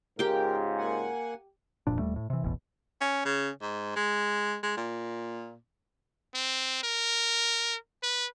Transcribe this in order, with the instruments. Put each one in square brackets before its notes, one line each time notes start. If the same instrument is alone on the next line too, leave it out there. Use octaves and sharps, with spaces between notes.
[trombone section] G#2 C#3 F4 [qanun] G4 G5 [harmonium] A#4
[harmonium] A#3 F#5 G#5
[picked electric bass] E1 F2 A#2 D4
D#1 D#2 G3 A3
A2
C3 E3
E1 A1 E2 B2
[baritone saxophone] C#4
C#3
G#2
G#3
G#3
A#2
[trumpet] C4
A#4
B4